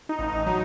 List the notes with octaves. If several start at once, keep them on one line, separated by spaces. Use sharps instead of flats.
D#4
A1
D#4
F#3 D#4